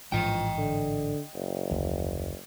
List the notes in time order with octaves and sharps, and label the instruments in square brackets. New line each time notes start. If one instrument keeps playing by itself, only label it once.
[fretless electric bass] A1 G#2 E3 [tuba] F3 [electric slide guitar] D#5 G5
[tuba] D3
F#1
[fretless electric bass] F1 D2